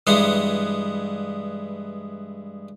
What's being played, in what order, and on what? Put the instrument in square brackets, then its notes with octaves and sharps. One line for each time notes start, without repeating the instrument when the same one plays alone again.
[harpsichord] G2 E3 G#3 B3 F#5 C6